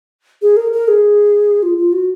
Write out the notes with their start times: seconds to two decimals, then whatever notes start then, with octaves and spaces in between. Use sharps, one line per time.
0.42 G#4
0.57 A#4
0.73 A#4
0.88 G#4
1.63 F4
1.78 F4
1.93 F#4